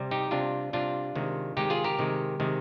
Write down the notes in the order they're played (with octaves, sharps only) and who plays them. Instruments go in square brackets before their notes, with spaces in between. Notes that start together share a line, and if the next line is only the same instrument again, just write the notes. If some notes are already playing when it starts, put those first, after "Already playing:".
Already playing: [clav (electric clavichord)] C3 G3
D#4 G4
C3 G3 D4 F4
C3 G3 D4 F4
C3 D#3 G#3
C3 D#3 G#3 D#4 G4
F4 G#4
G4 A#4
C3 D#3 G#3
C3 D#3 G#3